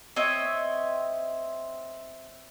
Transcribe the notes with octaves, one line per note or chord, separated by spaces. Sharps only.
C4 C#5 D#5 E5